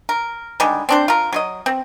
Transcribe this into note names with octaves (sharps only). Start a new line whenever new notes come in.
A#4
D3 D#3 G3 G#3
C4 D4 C5
F4 A#4
F#3 C5 D#5
C4